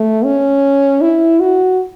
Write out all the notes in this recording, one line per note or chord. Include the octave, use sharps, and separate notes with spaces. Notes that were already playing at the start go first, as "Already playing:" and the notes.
Already playing: A3
C#4
E4
F#4